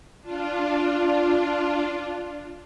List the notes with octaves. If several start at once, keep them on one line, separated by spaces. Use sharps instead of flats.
D4 F4